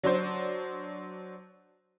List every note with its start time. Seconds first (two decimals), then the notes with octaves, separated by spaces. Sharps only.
0.03 F#3 D4 C5